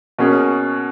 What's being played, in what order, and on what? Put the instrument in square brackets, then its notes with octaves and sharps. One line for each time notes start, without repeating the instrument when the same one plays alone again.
[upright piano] B2 A#3 C#4 G#4